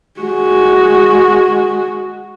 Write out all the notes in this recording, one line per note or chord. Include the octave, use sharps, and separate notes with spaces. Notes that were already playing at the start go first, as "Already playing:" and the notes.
G#3 F#4